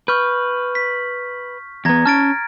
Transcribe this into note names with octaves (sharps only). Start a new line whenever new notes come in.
B4 C#6 F6 G6
B6
E2 B3 A#5 G#6 A#6
C#4 A5 F6 A6 D7